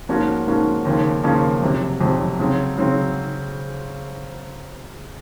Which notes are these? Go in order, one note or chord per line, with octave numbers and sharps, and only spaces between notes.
G#2 F3 A#3 C#4 F#4
G#2 F3 A#3 C#4 F#4
D#2 C#3 F3 A#3 C#4
D#2 C#3 F3 A#3 C#4
F2 C3 F#3
F2 C3 F#3
C#3 F#3 C4
C#3 F#3 C4